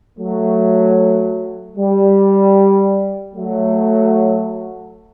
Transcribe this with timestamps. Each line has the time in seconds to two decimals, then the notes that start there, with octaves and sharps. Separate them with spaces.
0.18 F#3 A3
1.77 G3
3.35 F#3 A3